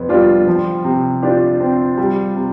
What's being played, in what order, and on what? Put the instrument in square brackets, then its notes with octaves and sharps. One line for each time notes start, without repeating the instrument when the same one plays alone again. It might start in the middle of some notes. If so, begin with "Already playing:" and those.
Already playing: [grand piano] F2 C3 B3
[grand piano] G3 [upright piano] D4 F4
[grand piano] F3
C3
[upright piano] D4 F4 [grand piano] G4
[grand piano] C4
G3
C3